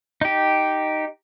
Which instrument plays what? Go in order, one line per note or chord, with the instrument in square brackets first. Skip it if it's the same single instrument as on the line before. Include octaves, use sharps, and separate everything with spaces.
[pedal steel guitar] D#4 G4